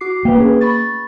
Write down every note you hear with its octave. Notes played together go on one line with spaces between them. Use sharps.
F#4 D6 C7
A#3 B4 F5 G5
C#4 G#4 B4
B5 C#6 A6